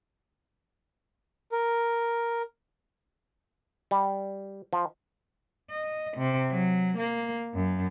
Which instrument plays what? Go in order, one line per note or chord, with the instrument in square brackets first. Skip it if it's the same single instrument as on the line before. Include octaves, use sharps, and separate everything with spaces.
[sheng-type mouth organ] A#4
[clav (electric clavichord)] G3
F3
[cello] D#5
C3
F#3
A#3
F#2